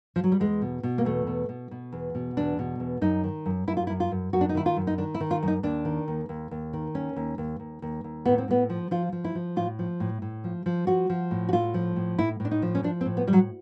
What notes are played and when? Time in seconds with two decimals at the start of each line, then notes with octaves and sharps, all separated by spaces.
0.16 F3
0.24 F#3
0.32 G3
0.40 E2 G#3
0.62 B2
0.83 B2
0.98 A#3
1.05 E2 A3
1.27 B2
1.49 B2
1.71 B2
1.92 E2
2.15 B2
2.37 E2 D4
2.59 B2
2.80 E2
3.01 F#2 D#4
3.24 D#3
3.46 F#2
3.67 F#2 E4
3.77 F4
3.87 E4
3.90 F#2
4.00 F4
4.12 F#2
4.33 F#2 F#4
4.41 D4
4.49 D#4
4.55 D#3 E4
4.66 F4
4.77 F#2
4.87 D#4
4.98 D#3 D4
5.14 E4
5.20 D#3
5.31 F4
5.42 F#2
5.48 D#4
5.63 D#2 D4
5.85 D#3
6.08 D#2
6.29 D#2
6.51 D#2
6.73 D#3
6.94 D#2 C#4
7.16 D#2
7.38 D#2
7.60 D#2
7.82 D#2
8.04 D#2
8.25 A2 B3
8.38 C4
8.48 A2 B3
8.70 F3
8.91 F3 F4
9.12 F3
9.24 E4
9.35 F3
9.56 A2 F4
9.79 F3
10.00 A2
10.22 A2
10.44 F3
10.66 F3
10.87 F3 F#4
11.10 F3
11.31 A2
11.49 F#4
11.53 A2 F4
11.74 F3
11.96 A2
12.18 A2 E4
12.40 A2 D4
12.51 D#4
12.62 F3
12.75 C#4
12.83 F3 D4
13.01 C4
13.06 A2
13.17 B3
13.27 F3 G3
13.33 F#3